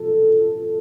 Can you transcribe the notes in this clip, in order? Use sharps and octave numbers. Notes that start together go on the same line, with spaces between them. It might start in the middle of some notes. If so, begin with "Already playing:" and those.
Already playing: A4